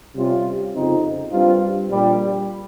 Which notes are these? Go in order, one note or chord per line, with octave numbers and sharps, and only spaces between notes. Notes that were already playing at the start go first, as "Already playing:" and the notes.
C3 G3 C#4 F4
F2 C#3 F3 C4 D#4
G2 G3 C4 F4
A#1 A#2 G3